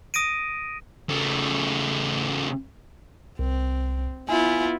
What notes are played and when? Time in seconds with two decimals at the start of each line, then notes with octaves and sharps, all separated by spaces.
0.14 D#6 A#6 D7 D#7
1.09 C#3 A3
3.39 C2 C4
4.29 B3 E4 F4 G#5